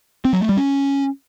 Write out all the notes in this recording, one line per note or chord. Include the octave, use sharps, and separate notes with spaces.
C4
F#3
A3
G3
C#4